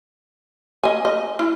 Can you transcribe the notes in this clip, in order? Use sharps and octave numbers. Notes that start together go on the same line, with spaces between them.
D#5 G#5
D#5
E4